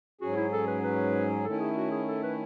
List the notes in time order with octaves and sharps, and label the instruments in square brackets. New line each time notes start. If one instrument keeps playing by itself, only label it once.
[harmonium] G#2 F#3 C#4 G#4 [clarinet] F#4
[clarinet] E4
A4
B4
B4
[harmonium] D#3 A3 C#4 E4 [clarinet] A4
[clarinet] G#4
F#4
G#4
A4
B4